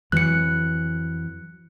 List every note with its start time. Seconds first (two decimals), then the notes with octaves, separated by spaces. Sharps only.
0.12 F2 E3 F#3 F#6 C#7